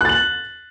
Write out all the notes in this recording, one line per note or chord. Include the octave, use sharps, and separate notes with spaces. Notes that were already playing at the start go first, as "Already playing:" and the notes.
F#6 A6 F#7